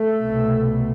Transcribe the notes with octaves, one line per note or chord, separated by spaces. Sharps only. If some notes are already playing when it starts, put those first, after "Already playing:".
Already playing: A3
C2 B2